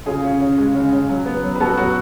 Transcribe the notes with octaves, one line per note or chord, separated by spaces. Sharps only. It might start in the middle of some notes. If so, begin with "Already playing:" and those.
C#3 F4 G#4
C#4
C#3
G#3
C#3
C#3
F#3
B3
F#3
B4
B3 F#4 A4
F#3 F#4